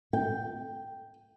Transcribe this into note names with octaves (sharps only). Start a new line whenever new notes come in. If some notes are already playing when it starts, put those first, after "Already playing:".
G5